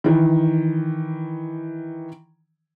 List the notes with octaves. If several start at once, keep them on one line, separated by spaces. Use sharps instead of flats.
D#3 E3